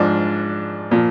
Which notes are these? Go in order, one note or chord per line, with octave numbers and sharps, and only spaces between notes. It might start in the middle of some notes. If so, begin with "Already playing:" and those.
Already playing: G#2 F3 D4
A#2 F3